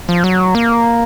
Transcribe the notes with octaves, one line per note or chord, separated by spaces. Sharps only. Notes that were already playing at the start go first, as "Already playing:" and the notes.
F3
F#3
A#3